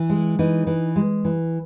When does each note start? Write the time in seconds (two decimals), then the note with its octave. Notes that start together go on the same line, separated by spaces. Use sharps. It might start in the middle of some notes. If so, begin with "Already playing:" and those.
Already playing: E3
0.10 G#3
0.39 E3 D#4
0.67 E3
0.96 G#3
1.25 E3